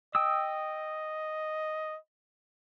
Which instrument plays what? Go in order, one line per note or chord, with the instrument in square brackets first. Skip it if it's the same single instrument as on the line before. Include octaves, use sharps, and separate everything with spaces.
[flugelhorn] D#5 [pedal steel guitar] G5 D#6 E6